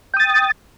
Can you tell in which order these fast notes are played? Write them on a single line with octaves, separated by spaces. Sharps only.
G5 D#6 A6